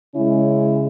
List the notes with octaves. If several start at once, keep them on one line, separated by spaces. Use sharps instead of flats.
C#3 G#3 C#4 E4